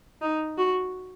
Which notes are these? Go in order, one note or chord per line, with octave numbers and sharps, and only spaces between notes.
D#4
F#4